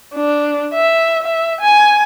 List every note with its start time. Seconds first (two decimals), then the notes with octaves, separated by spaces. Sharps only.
0.15 D4
0.74 E5
1.23 E5
1.61 G#5